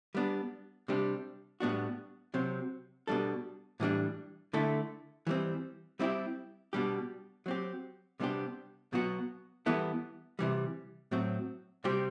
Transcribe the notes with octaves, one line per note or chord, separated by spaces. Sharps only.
G3 B3 D4
C3 G3 D4 G4
A2 G3 B3 D4 F#4
C3 F#3 C4
B2 G3 D4 A4
A2 E3 G3 D4
D3 A3 E4 A4
E3 G3 C4
G3 C4 E4 G4
B2 G3 D4 G4
F#3 C4 G4
C3 G3 B3 D4 G4
B2 F#3 B3 F#4
E3 G3 B3 E4 A4
C3 E3 G3
A2 F#3 C4
C3 G3 C4 G4